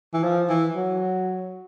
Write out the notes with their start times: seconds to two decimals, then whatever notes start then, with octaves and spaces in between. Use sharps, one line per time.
0.13 E3
0.23 F3
0.49 E3
0.75 F#3